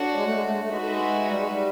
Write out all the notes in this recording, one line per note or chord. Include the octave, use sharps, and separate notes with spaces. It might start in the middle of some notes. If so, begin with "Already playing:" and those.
Already playing: D4 F#4 A4 C#5
G#3
A3
G#3
A3
G#3
A3
G#3 D#4 F#4 B4 E5
A3
G#3
G3
G#3
G3